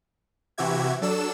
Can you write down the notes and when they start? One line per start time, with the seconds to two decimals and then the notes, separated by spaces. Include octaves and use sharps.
0.58 C3 E3 F#4 G4 E5 G#6
1.01 F#3 D4 A4 E6 E7